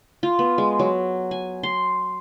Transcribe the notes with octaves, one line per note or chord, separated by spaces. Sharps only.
F4
B3
G#3
F#3
G#5
C6